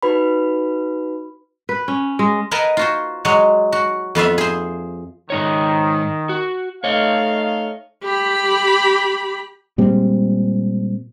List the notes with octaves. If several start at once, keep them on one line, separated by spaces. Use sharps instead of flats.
D#4 F#4 B4 B5
B4
C#4
G#3
A#4 B4 D#5 F#5 G#5 A5
F4 F#4 C5
F#3 G#3 F#4
F#4
F2 B3 F4 E5
G#4 C5
G#2 D#3 D#4 C#5
F#4
A3 D#4 C#5 D#5 F5
G4 B5
A#2 G3 G#3 C4